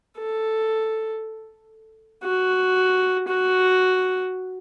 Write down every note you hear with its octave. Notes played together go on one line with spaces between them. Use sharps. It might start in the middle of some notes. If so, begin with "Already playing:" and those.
A4
F#4
F#4